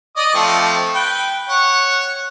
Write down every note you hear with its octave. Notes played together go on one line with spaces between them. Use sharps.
D5 D#5 D#6
F3 A3 C4
B4 G5
C#5 F#5